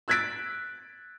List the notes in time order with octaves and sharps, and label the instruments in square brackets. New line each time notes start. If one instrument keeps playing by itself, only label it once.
[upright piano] E6 F#6 G#6 A6 B6 D7